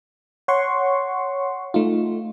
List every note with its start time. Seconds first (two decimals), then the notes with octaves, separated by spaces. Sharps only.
0.48 C#5 F#5 C6 C#6
1.74 A3 D#4 F4